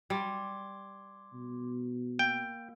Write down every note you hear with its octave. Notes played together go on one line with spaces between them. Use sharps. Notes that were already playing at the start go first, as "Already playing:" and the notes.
G3 C6 D6 G#6
B2
A#3 G5